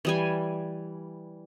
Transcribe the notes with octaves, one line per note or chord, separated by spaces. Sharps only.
E3 G3 G#5